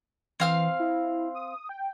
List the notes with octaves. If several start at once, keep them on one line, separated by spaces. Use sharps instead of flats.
E3 C4 F5 F6
E4
D#6
G5